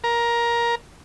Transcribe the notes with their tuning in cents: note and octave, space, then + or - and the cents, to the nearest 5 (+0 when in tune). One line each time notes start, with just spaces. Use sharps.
A#4 +15